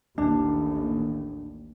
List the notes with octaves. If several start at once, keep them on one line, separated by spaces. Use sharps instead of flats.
A1 D#2 D4